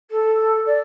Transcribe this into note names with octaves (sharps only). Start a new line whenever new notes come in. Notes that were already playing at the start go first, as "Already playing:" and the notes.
A4
D5